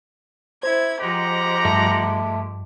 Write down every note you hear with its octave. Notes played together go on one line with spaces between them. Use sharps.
E4 C5 G#6
F3 G#3 G4 F#5 G5 A#5
G2 A3